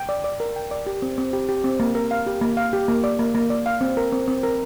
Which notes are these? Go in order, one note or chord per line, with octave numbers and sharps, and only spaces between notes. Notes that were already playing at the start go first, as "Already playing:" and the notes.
Already playing: G5
D5
D5
A#4
G5
D5
G4
C4
C4
G4
G4
C4
A#3
A#4
F5
G4
A#3
F5
G4
A#3
D5
A#3
A#3
D5
F5
C4
A#4
C4
C4
A#4